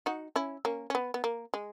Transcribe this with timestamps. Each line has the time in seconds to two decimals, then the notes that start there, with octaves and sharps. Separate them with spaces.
0.06 D#4 F#4
0.36 C#4 E4
0.65 A#3 C#4
0.90 C#4
0.95 B3
1.14 B3
1.24 A#3
1.54 G#3